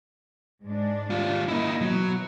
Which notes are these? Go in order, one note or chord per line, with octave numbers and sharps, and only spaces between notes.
G#2 G#3 D4
G3 F4
D#3 A#3 D#4 E4 D#5
B2 E3 F#3